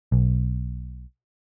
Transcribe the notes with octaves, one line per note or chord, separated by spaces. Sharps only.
B1